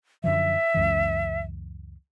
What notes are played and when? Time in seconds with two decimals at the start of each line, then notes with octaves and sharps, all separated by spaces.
0.24 F#2 D3 F3 E5
0.74 C#2 F#2 E3